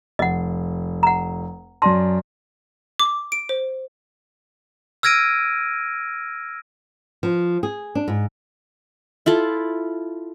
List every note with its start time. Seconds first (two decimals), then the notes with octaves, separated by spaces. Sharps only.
0.19 F1 D#5 F#5
1.03 F#5 A#5
1.82 F#2 D5 A5 C6 A#6
2.99 D6
3.32 D7
3.49 C5
5.03 E6 F6 G#6 A#6 D7 D#7
7.23 F3
7.63 G#4
7.95 D4
8.08 G#2
9.26 E4 F4 A4